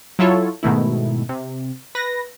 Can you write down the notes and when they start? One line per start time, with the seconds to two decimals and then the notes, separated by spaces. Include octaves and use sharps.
0.19 F#3 E4 F4 A4 C#5
0.63 G#2 B2 D#3 A3 E4
1.29 C3
1.95 B4 A#6